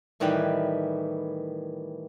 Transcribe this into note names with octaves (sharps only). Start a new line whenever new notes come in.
A2 D#3 E3 G3 B4 G5